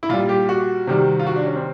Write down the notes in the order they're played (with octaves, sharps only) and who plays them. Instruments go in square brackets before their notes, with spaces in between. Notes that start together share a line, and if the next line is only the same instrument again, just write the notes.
[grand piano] E4
A#2 G3 F4
G4
F#4
C3 D#3 G3
F4
F#4
D4
C#4
C4